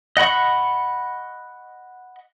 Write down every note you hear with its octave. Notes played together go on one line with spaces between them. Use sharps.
D#5 F#5 B5 C#6